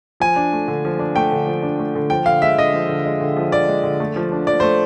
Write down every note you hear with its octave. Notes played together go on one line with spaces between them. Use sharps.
F3 G#5
D4
A3
D3
F3
D4
A3 G5
D3
F3
D4
A3
D3
F3 G5
D3 F5
G#3 E5
D3 D#5
F3
D3
G#3
D3
F3
D3 D5
G#3
D3
A3
F3
D4
F3 D5
A3 C5